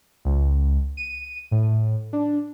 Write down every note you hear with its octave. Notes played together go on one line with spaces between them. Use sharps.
C#2
D#7
A2
D4